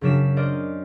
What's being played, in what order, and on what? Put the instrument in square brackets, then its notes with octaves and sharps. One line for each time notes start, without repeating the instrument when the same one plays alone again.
[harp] F#2 C#3 F#3 D4 B6 E7
A#4 C5 D5 D#5